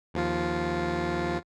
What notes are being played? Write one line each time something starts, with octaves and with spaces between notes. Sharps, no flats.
D#2 F3 F4